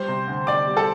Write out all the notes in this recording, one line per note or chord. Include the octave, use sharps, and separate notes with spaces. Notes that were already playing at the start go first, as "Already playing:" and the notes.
Already playing: G3 C5 C6
C3
D2
D2 D5 D6
G3
A4 A5